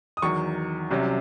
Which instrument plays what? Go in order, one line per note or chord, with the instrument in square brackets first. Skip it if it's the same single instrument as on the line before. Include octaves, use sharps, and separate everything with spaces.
[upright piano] D#6
E2 D#3 F#3 C#6
C2 C3 F#3 C#4